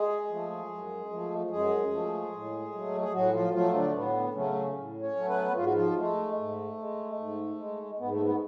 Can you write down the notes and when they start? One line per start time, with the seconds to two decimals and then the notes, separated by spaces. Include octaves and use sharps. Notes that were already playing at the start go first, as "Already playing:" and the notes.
Already playing: G#3 G#4
0.29 F3 A3
0.69 F#2
1.10 F3 A3
1.50 F#2 G#3 G#4
1.91 F3 A3
2.32 A2
2.72 F#3 A3
3.02 G#4
3.12 A2 F#3 F#4
3.33 F3 F4
3.53 F3 F#3 A3 F4
3.74 D3 D4
3.93 A2 B3
4.34 C#3 F#3 A3 C#4
4.74 A2
5.02 C#4 C#5
5.15 F#3 A3
5.28 B3 B4
5.55 G#2 F4
5.64 F#4
5.74 F3 F4
5.96 G#3 A3
6.36 G#2
6.77 G#3
7.18 G#2
7.58 G#3
7.99 G#2 B3
8.10 A3
8.21 B3